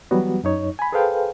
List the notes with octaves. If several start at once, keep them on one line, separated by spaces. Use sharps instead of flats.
E3 F#3 G3 B3 F#4
F#2 D#4 C#5
G#5 B5
G#4 A4 B4 C5 F5 G5